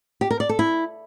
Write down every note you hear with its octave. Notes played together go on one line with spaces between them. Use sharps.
G4
A#4
D5
A4
E4